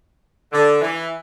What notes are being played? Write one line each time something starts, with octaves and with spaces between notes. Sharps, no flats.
D3
E3